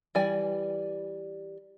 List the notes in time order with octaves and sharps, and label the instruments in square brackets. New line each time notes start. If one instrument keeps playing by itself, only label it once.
[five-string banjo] E3 G3 D5 G#5